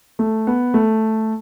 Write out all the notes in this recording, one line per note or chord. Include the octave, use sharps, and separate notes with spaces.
A3
B3
A3